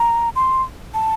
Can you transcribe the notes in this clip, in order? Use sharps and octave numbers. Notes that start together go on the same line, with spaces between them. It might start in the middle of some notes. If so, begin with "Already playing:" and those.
Already playing: A#5
C6
A5